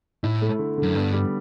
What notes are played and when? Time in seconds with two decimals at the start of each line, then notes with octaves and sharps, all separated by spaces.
0.23 A2 E4
0.42 A3
0.59 D3
0.78 D3
0.83 F#2
0.95 G2 B3
1.13 G3